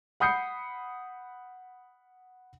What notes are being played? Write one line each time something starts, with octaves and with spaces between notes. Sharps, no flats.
F#5 B5 D#6 G6 C7 C#7